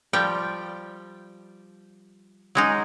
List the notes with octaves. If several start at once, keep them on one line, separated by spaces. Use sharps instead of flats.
F3 G3 G5
F#3 G#3 D#4